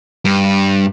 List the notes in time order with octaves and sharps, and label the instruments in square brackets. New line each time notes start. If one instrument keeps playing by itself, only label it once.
[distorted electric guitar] G2